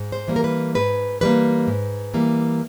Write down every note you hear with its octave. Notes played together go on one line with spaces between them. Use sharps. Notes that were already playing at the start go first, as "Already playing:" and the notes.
Already playing: G#2
C5
E3 G3 A#3
A#4
B4
G#2 B4
E3 G3 A#3 B4
G#2
E3 G3 A#3